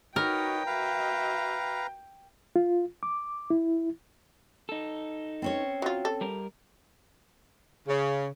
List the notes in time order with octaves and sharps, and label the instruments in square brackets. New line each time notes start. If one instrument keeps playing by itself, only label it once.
[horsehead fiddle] D#4 F#4 [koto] A#4 [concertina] B4 C#5 D#5 [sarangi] G5
[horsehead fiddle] F#4 E5 [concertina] B4 F5 A#5
[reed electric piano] F4
D6
E4
[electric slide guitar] D#4 A4
[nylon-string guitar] C4 C#4 C#5
[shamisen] F#3 F4
A4
[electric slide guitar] G3 A#4
[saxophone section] C#3